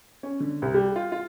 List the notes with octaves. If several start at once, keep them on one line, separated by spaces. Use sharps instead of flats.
C#4
D3
C2
G3
F4
F4